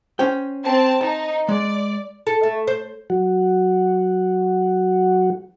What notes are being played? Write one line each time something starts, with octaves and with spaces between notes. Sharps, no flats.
C#4 C5 G5
C4 A5
D#4 A5
G#3 D5
A4
A3
C5
F#3 F#4